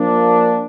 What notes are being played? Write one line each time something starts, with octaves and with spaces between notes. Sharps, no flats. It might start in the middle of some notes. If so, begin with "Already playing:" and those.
Already playing: F3 A#3 D4